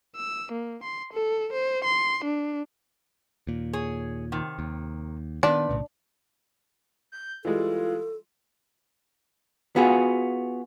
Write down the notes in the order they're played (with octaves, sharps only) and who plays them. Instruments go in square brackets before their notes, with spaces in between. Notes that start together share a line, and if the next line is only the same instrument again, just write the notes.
[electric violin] E6
A#3
C6
A4
C5
C6
D4
[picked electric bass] D#2 A#2
[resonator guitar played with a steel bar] G#4 C#5
C3 D#3
[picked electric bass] D#2
[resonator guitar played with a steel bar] A#2 B4 D5 [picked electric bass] D#3 E3 B3 [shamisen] D4
[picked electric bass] B1 A2 C#3
[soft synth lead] G6
[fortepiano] E3 G3 G#3 [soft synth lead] F4 [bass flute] A4
[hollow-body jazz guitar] B3 F4 F#4 G#4